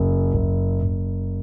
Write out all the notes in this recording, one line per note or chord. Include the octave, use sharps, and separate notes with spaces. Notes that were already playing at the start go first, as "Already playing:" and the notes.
Already playing: F#1
F#1
F#1